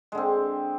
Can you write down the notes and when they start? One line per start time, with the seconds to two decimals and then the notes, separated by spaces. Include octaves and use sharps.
0.12 G#3
0.15 D3
0.17 C4